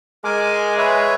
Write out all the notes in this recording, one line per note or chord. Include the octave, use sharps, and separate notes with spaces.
G#3 A#4 G#5 D6
B4 C#5 E5